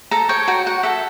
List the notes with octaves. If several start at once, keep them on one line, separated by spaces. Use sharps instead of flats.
A4 A#5
C#5 G5
F#4 G5
F#4 F#5
A4 E5